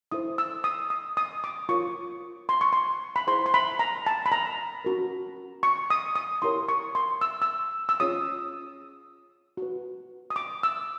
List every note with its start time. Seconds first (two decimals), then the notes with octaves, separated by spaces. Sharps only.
0.12 E4 A4 C5 D#6
0.38 E6
0.64 D#6
0.90 D#6
1.17 D#6
1.44 D6
1.69 F4 A#4 C#5 C#6
2.49 C6
2.61 C#6
2.73 C6
3.16 B5
3.27 E4 G#4 C5 C6
3.46 C6
3.54 B5
3.79 A#5
4.07 A5
4.26 B5
4.32 A#5
4.85 C#4 F#4 A#4
5.63 C#6
5.90 D#6
6.16 D#6
6.42 E4 G4 A#4 C#5 C6
6.69 C#6
6.95 C6
7.21 E6
7.42 E6
7.89 E6
8.00 C#4 F4 G#4 C#5 D#6
9.57 F#4 B4
10.30 D#6
10.36 D6
10.63 E6